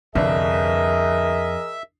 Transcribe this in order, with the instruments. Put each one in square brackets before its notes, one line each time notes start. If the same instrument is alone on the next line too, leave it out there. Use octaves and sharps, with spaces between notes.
[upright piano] G1 C2 D4 [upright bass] F2 [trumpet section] G#4 A#4 D#5 [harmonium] E5